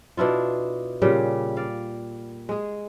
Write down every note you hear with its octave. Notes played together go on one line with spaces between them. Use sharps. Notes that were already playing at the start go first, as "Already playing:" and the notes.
B2 D4 E4 F4
A#2 C#3 G3
D5 F5
G#3 G#4